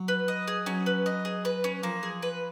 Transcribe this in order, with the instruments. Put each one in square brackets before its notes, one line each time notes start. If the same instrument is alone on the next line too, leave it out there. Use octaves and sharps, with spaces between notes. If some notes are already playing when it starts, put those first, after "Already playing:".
Already playing: [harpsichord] F#3
[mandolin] B4
D#5
G#4
[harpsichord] F#3 [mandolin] C#4
[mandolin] B4
D#5
G#4
B4
C#4
[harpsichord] F3 [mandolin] A#3
[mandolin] G#4
B4